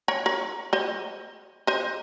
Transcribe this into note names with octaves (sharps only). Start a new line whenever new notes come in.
A#4 C#5
A#4 C#5
C5 D#5
C5 D#5